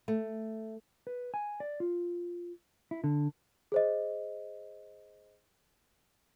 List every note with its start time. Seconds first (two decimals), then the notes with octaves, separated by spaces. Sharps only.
0.08 A3
1.07 B4
1.34 G#5
1.60 D5
1.80 F4
2.91 E4
3.04 D3
3.72 G#4 C5 D#5